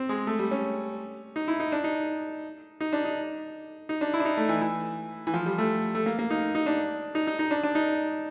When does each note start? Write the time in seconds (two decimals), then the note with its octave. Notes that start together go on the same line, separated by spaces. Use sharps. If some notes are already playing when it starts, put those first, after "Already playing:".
Already playing: C4
0.09 G#3
0.27 A3
0.39 G3
0.51 C#4
1.36 D#4
1.48 E4
1.60 D#4
1.72 D4
1.84 D#4
2.81 D#4
2.93 D4
3.05 D#4
3.89 D#4
4.01 D4
4.14 E4
4.20 D4
4.25 D#4
4.37 A3
4.49 E3
4.61 E3
5.27 E3
5.34 F3
5.46 G3
5.58 A3
5.95 A3
6.06 A#3
6.19 A#3
6.31 D#4
6.55 D#4
6.66 D4
7.15 D#4
7.27 D#4
7.39 D#4
7.51 D4
7.63 D4
7.75 D#4